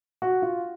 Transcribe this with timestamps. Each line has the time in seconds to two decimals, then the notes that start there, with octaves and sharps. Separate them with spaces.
0.22 F#4
0.42 F4